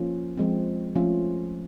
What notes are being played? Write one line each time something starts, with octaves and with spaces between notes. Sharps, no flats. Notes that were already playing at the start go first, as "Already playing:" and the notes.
Already playing: F3 A#3 C#4 F4
F3 G#3 C4
F3 A3 C#4 F4